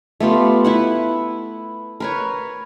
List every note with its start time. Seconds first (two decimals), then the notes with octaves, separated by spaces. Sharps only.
0.20 A3 B3 F4 G4
0.64 E4 B4 F#5
2.00 A#4 B4 C#5